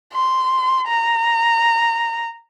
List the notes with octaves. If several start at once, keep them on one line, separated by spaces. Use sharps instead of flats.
C6
A#5